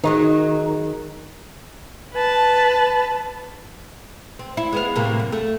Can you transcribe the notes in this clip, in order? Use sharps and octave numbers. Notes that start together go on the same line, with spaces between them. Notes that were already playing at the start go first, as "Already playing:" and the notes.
D#3 F#3 G#3 D#4
B4 A5
C4
E4
G#3 B3 F5
A2 C3 A#3
F#2
A3